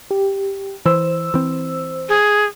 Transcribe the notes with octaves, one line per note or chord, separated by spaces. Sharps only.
G4
E3 C5 E6
E3 C4
G#4